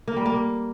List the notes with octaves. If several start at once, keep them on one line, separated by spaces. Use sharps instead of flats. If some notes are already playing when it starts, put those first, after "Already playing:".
A#3
G3
A#3